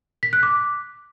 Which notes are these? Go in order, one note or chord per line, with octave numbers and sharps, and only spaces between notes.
B6
F#6
D6